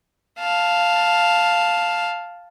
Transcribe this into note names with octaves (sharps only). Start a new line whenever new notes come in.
F5 A5